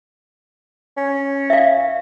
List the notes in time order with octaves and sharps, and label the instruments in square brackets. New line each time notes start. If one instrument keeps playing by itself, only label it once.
[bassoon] C#4
[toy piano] E5 F5